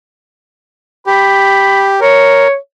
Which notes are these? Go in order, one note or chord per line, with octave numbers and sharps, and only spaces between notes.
G4 B5
A#4 C#5